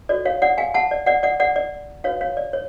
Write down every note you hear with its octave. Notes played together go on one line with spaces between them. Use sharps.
F#4 A4 C#5 D5
C#5 F5
D5 F#5
F5 G#5
F#5 A5
D5
D5 F#5
D5 F#5
D5 F#5
D5
D4 F#4 B4 C#5 F5
C#5 F5
D5
C#5